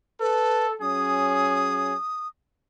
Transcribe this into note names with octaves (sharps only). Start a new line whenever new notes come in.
A4 B4
F#3 C#4 G#4 D#6